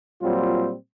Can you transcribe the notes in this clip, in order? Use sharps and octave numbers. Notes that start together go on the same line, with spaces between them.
A#2 F#3 G3 C4 F4